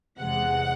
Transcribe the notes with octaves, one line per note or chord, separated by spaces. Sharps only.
E2 C3 E3 G#3 F#5